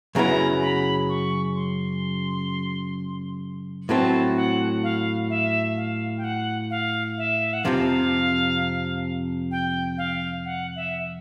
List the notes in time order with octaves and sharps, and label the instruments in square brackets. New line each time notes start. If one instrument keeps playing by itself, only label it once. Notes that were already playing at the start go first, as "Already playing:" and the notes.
[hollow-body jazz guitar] F#2 C#3 F#3 B3 E4 [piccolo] A#5
[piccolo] B5
C#6
C6
[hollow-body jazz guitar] A2 F#3 A3 C4 [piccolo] A5
[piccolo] F#5
F5
E5
F5
G5
F#5
F5
E5
F#5
[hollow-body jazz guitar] F2 C3 F3 [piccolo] F5
[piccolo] G5
F5
F#5
E5